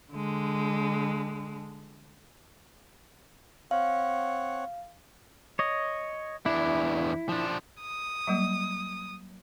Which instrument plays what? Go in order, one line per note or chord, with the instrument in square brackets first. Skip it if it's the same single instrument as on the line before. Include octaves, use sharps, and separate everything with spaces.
[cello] D3 G#3
[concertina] C4 C#5 F#5 [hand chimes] F5
[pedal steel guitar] C#5 D#5
[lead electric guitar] E2 D4 [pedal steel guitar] E4
[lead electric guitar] F3 D4
[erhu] D#6
[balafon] F#3 G3 A#3